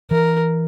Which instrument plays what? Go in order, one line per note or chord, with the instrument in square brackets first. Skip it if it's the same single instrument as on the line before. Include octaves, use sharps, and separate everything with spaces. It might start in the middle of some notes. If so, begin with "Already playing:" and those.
[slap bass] E3 [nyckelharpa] A#4